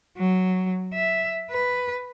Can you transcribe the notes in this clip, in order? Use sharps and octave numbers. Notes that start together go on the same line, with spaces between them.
F#3
E5
B4